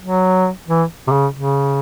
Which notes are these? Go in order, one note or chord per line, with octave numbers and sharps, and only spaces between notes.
F#3
E3
C3
C#3
C#3